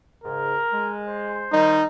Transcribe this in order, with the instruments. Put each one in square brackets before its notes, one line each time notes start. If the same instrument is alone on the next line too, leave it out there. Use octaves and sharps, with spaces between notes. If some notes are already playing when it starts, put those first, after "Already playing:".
[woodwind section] G#2 C#3 [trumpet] A#4
[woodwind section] G#3
[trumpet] C5
[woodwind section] D#3 G3 [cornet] D#4